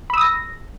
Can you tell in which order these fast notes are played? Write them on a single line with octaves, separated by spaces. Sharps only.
B5 E6 D#6 A#6